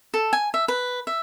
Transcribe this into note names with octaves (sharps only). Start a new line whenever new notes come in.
A4
G#5
E5
B4
E5